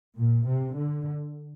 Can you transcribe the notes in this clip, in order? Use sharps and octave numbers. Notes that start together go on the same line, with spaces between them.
A#2
C3
D3